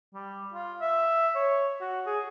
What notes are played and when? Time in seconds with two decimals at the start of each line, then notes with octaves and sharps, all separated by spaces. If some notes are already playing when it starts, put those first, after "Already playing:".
0.14 G3
0.54 F4
0.81 E5
1.35 C#5
1.81 F#4
2.07 G#4